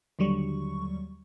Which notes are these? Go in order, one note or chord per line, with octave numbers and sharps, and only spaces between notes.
D#2 D3 F#3 G3 C#6